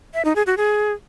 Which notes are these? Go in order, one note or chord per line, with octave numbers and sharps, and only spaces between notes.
E5
D#4
G#4
F#4
G#4